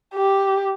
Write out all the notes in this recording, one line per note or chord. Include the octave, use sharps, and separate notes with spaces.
G4